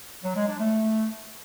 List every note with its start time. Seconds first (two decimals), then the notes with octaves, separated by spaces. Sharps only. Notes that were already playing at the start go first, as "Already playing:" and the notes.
0.24 F#3
0.36 G#3
0.48 D4
0.60 A3